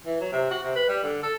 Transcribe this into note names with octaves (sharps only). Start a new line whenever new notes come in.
E3
F#3
C3
F#4
C3
B4
G3
D3
A4